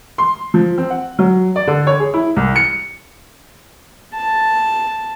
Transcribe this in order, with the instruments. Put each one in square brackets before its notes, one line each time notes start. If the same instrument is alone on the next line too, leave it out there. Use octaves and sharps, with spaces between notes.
[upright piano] C6
F3
C4
F#5
F#3
D5
D3
C#5
G#4
E4
C2
C#7
[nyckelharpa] A5